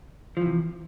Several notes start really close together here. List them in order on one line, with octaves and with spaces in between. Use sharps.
F3 E3 C3